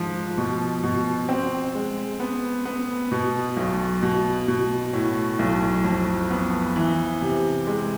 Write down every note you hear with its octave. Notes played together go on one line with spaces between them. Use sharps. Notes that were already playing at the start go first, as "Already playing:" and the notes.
Already playing: G#2 F3
B2
B2
C4
G#3
B3
B3
B2
B1
B2
B2
A2
B1
F2
B3
E3
C3
G#3